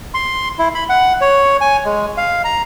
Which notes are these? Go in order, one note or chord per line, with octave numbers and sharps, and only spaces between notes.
C6
E4
B5
F#5
C#5
G#5
G#3
F5
A#5